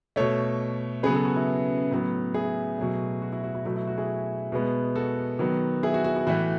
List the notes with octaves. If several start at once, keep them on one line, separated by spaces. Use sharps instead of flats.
B2 A3 A4 C#5
C#3 F#3 B3 G#4 B4
F#4 A4
F#4
E4
A2 F#3 B3
E4 G#4
B2 F#3 A3
F#4
E4
F#4
E4
B2 F#3 A3 E4
E4
F#4
E4 G#4
B2 G#3 B3
F#4 A4
D#3 F#3 B3
E4 G#4
F#4
F#4
E4
A2 E3 A3 F#4